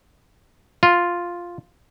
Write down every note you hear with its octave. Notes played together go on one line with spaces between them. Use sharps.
F4